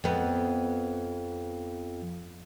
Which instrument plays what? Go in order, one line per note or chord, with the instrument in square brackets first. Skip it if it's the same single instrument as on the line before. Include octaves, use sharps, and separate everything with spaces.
[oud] F2 B3